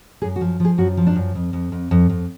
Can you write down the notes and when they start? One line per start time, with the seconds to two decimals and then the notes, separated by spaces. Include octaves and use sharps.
0.22 F#2 G#4
0.36 F#4
0.41 F3
0.60 F3 G#4
0.78 F#2 F#4
0.97 F3
1.07 D4
1.16 F#2
1.35 F2
1.53 F2
1.72 F2
1.91 F2
2.10 F2